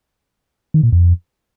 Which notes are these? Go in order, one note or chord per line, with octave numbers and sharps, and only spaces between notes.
D#3
A#2
F2